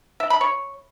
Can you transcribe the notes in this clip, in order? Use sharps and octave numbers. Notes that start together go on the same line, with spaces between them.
E5
B5
C#5